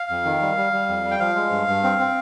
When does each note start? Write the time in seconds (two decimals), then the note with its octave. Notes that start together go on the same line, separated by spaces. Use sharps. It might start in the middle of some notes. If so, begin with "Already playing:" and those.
Already playing: F5
0.10 F2
0.25 D#3
0.41 G3
0.57 G3
0.73 G3
0.89 F2
1.04 G3
1.11 G5
1.20 F3 F5
1.35 G#3
1.51 G2
1.68 G2
1.84 C4
1.99 C4